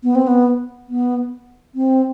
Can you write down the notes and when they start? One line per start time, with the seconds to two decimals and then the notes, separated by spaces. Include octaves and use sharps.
0.03 B3
0.15 C4
0.27 B3
0.89 B3
1.75 C4